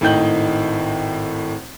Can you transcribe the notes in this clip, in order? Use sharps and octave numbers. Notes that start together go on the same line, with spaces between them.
G#1 A2 D#4 G5 G6 F#7